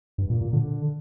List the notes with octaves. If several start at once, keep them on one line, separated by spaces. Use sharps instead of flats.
G2
A#2
A#2
D3